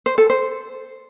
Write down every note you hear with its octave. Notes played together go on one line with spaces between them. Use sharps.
C5
A4
C5